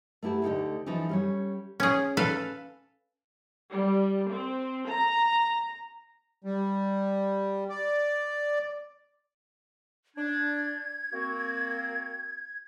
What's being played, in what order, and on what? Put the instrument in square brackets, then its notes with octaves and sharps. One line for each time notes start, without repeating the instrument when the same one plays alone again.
[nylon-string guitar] A3 B3 E4 G4 A5
D2 D3 D#4 G4 A4
E3 F3 D#4 A4 B4
G3 C#4 C#5
[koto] C#4 G#4
A4 B4 F5
[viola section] G3
C4
A#5
[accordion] G3
D5
[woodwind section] D4 [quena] G#6
[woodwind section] A#3 C4 F#4